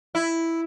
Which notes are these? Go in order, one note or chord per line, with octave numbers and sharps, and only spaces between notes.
E4